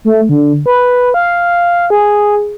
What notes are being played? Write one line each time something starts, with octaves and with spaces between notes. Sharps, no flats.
A3
D3
B4
F5
G#4